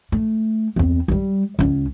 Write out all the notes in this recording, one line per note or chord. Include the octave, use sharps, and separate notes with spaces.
A3
E2 C4
F#3 G3
C#2 C#4